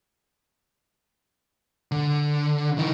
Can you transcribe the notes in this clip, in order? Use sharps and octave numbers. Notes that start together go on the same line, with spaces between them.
D3
E3 D#4